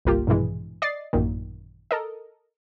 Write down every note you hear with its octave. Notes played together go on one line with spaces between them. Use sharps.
G1 C2 A#3 F4 G4
A#1 G2 B2 E3 G#3
D5 D#5 A6 C7
A1 F#2 A#2 D#3
A4 A#4 D#5